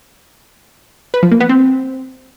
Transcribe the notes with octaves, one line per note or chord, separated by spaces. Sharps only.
B4
F3
A#3
B3
C4